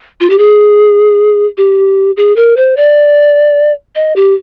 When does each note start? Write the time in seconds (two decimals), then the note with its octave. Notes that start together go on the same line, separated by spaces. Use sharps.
0.20 F4
0.30 G4
0.38 G#4
1.57 G4
2.17 G#4
2.36 A#4
2.57 C5
2.77 D5
3.95 D#5
4.16 G4